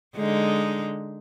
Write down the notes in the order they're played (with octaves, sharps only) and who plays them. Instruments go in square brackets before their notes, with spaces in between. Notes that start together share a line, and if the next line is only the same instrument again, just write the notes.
[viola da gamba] D3 G#3 D#4